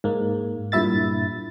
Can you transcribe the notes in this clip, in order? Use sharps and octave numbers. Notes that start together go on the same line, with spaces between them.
G#2 A#3
G2 A#2 E4 E5 A6